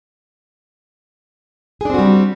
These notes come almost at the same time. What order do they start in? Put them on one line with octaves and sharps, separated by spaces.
G#4 D4 C4 F#4 G3